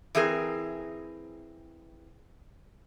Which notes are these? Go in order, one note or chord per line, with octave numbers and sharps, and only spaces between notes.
E3 C4 G#4 A#4